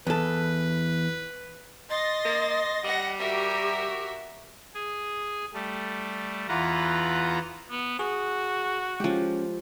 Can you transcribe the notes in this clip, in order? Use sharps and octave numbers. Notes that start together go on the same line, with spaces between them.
E2 A4 B4
D#5 C6 A6 A#6
A#3
G3 F#5 A#6
F#4 G4 A#4 E5
G#4
G3 A3
E2 E3 F4 B4 F#5 A#5
B3
F#4 G#4
F3 G#3 C#4 G4